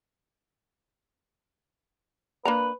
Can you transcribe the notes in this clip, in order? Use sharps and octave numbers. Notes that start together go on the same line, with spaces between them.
A#3 D4 B4 A#5